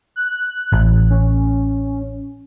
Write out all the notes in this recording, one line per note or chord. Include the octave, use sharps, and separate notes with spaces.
F#6
A1
C#4